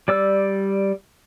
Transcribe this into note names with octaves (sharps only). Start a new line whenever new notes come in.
G3 D5 E6